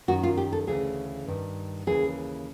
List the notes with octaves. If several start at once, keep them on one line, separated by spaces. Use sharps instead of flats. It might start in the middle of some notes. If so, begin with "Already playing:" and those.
F#2 D#3 F#4
F4
G4
A4
D2 C#3 E3 G#4
G2 D#3
D#2 C#3 E3 G#4